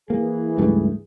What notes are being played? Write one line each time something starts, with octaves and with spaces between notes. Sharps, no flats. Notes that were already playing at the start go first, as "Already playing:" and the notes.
E3 A#3 G#4
C#2 G2 A3